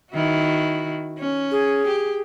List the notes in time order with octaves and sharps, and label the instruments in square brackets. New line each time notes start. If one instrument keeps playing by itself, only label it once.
[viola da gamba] D#3 E4 F#4
C#4
[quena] G#4
[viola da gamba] G4